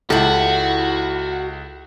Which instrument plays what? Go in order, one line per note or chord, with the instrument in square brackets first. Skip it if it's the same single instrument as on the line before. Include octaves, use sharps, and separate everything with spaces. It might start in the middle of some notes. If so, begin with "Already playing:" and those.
[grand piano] C#2 [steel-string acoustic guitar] E4 G4 [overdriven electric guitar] F#4 [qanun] A4